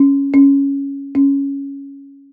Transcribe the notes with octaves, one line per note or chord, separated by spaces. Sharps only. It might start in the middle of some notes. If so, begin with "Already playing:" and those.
Already playing: C#4
C#4
C#4